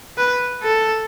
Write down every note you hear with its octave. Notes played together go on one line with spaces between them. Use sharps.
B4
A4